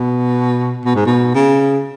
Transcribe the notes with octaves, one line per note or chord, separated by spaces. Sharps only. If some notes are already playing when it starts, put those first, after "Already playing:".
Already playing: B2
B2
G#2
B2
C#3